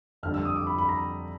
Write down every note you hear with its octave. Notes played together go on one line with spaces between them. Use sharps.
F2 D3 G3 F6
E6
D#6
D6
B5
B5
A#5